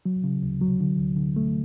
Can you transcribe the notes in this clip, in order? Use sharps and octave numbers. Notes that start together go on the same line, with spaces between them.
F#3
C#3
D2
F#3
D3
D2
D3
A3